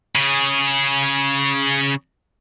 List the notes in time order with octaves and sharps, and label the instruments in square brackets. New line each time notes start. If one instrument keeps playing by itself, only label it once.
[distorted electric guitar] C#3 G#4